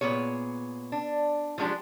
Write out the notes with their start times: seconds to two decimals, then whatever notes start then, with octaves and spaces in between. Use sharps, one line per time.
0.01 A#2 F3 B3 G#4 C#5
0.92 D4
1.58 F3 F#3 G#3 D4 G4